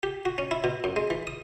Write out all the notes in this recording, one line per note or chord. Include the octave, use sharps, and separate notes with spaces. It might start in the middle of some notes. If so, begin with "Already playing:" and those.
G4
F#4
C#4
E4
B2
F#2
G#3
E3
D#6